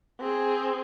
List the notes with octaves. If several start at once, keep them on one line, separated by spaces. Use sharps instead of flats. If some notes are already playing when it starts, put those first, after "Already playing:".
C4 G#4